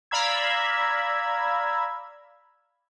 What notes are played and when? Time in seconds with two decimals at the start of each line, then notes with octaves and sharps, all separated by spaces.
0.11 D5 F5 A#5 B5 E6 G#6